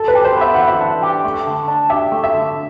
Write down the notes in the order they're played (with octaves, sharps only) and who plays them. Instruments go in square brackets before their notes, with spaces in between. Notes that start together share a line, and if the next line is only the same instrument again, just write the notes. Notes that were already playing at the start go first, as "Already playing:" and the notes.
Already playing: [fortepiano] A4
B4
[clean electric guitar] G4
[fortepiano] C5
[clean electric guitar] B3 [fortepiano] E5
[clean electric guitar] E3 [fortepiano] F#5
[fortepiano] E5
[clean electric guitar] D4
G4
A3
D3
D4
[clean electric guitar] G4 [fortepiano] E5
[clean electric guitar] A3
[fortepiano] E5
[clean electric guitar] D3